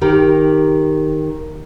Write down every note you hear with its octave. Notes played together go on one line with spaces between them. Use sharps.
D#3 G4 A#4